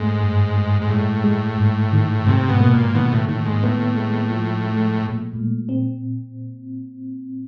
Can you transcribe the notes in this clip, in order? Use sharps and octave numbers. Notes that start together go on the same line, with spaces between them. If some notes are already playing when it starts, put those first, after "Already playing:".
Already playing: G#2 A3
G2
G#3
G#2
A2 G#3
G#3
G#2
D#3
G#2 C3
B2
A#3
A#2
B2 D#3
A2
A2 D#3
G#2
A2 B3
G#3
F3
A3
A#2
A#2
C4